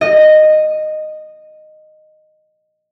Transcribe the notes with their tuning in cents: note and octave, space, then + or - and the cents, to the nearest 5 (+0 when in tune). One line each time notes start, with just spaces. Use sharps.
D#5 -10